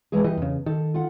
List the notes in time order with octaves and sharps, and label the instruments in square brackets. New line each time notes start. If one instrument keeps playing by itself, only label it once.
[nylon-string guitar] E3 G#3 G#4
[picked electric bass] E3 G3 [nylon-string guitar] D#5
[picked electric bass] E2 C#3
[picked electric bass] D#3 [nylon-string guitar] A4
[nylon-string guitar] F4 F#5